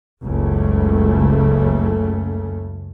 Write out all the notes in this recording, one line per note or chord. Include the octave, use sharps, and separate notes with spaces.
F#1 C#2 C#3 A3